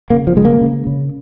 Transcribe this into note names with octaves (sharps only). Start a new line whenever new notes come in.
C#3 A#3
F3
C#3 G#3
A#3
C#3
C#3